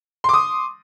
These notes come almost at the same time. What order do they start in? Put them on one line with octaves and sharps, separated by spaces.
C6 D6 D#6